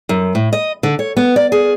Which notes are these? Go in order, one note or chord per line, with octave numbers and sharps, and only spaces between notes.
F#2
A2
D#5
D3
C#5
B3
D5
G#4